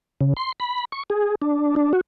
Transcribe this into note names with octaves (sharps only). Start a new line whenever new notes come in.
C#3
C6
B5
C#6
G#4
D4
D4
F#4